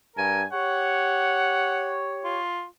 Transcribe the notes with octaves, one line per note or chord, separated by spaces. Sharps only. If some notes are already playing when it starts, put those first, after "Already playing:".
G2 A#4 G#5
G4 C#5 F#5
F4